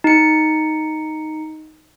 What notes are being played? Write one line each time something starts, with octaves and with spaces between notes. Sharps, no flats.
D#4 C#7